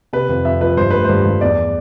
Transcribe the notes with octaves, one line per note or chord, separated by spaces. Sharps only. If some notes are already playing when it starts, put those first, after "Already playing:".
C3 B4
F2
F2 E5
F3 B4
G2 C5
A3 B4
C5
G2
G2
E2 D5